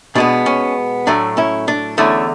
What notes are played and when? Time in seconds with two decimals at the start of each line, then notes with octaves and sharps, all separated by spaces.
0.15 B2 G#3 B3 D4
0.46 C#4
1.07 A2 F#3 A3 D4
1.37 C#4 E4
1.68 D4
1.98 E2 D3 A3 C#4 E4